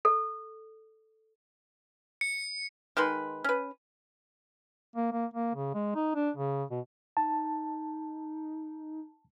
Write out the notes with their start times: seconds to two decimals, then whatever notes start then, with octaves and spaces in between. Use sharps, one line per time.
0.05 A4
2.21 C#7
2.97 D#3 G#3 B4 C6
3.44 C#4 B4
4.96 A#3
5.12 A#3
5.34 A#3
5.55 C#3
5.74 G#3
5.95 D#4
6.15 D4
6.37 C#3
6.71 B2
7.17 D#4 A5